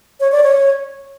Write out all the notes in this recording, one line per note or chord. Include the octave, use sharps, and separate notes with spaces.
C#5
D5
C#5